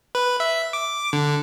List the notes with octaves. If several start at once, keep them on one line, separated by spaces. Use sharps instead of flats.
B4
E5
D6
D3